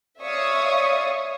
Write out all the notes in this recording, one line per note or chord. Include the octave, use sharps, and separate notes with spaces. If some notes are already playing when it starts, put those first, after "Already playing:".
C#5 D5 E5 F5 C#6 D#6